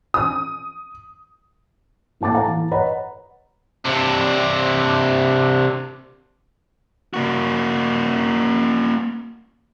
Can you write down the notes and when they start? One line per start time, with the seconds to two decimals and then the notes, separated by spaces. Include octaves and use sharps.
0.14 D#6
2.21 A2 A#3 A5 D6 A6
2.34 A4 F5 A5 A#5
2.46 E3
2.71 B4 C#5 D#5 F#5 A#5 B5
3.86 C3 D4
7.14 A#3 F#4